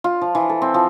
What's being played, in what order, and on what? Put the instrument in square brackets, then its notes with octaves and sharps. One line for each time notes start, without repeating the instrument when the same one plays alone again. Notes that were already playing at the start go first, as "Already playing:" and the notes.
[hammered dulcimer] F4
F3
E3
A4
C4
F3